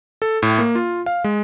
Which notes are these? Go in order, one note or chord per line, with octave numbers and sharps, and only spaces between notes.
A4
A2
A#3
F4
F5
G#3